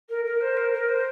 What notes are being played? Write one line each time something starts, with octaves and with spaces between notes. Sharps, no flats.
A#4
A#4
C5
A#4
A#4
C5